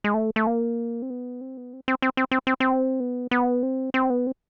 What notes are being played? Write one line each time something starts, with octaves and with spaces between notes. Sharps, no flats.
G#3
A3
A3
A#3
C4
B3
C4
B3
C4
C4
C4
C4
C4
C4
C4
B3
B3
C4
C4
B3
C4